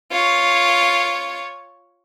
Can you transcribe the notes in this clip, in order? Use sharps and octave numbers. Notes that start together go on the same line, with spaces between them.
F4 C#5